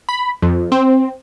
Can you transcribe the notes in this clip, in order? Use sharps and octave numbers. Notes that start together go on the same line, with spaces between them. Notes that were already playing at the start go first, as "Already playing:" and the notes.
B5
F2
C4